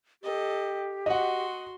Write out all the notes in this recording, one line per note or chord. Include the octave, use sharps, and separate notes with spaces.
G4 A4 D#5
F#4 D#5 F#5 C6